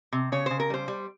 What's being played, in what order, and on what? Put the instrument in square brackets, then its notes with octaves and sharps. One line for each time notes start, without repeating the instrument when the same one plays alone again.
[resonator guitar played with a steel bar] C3
C#3 C#5
C#3 C5
A#4
G3 C5
G3